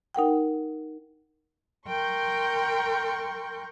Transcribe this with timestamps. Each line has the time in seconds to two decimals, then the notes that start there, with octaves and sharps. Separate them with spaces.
0.15 D#4 A#4 F#5 G5
1.87 A#4 G5 C6 C#6 G6